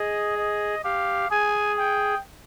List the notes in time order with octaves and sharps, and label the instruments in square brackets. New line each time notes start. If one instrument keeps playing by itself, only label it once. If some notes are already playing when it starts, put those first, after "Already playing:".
Already playing: [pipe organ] G#4 [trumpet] D#5
[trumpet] D#5
[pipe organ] G4 [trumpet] F5
[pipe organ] G#4 [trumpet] G#5
[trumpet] G5